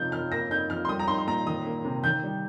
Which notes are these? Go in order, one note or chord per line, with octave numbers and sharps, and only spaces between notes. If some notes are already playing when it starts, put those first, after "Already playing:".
Already playing: C3 F3 D#4 G6
F3 F6
A#3 A#6
D#4 G6
F3 F6
C6
G3 D#6
A#5
D#4 C6
C6
A#2 A#5
D#3 D#6
A#3
C3
D#3 G6
G3